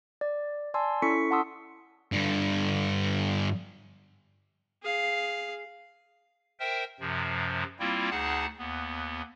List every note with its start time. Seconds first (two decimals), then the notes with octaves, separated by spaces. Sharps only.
0.21 D5
0.74 D5 G#5 A5 C6 E6
1.02 C#4 E4 A4 C#6 B6 C#7
1.31 F#5 A5 C6 D#6 E6
2.12 G2 D3
4.82 G#4 F5
6.60 A#4 C5 E5 G5
7.00 F#2 C3 F3
7.79 G3 A#3 C4 E4 F4
8.10 D2 D#4 G#4 F#5 A5
8.58 D#2 B3